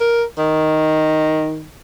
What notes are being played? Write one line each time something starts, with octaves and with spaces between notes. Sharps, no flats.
A#4
D#3